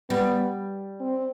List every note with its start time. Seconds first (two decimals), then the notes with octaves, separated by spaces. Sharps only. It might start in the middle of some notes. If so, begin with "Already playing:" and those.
0.10 G3 B3
1.00 C4